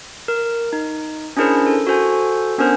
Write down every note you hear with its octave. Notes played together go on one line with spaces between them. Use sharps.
A#4
D#4
C#4 D4 E4 G#4 A#4 C5
A4
F#4 A4 C5 G#5
B3 C#4 D4 A#4 C5